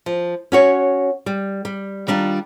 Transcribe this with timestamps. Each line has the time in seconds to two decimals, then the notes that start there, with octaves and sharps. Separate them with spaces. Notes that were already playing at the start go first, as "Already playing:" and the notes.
0.06 F3
0.52 C#4 F#4 C#5
1.26 G3
1.65 G3
2.08 D#3 G3 D4 F4